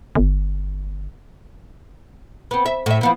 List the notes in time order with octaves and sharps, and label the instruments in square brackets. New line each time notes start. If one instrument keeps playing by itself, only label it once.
[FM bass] G1
[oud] B3 C4
E5
A2 E5
F3 B3 E4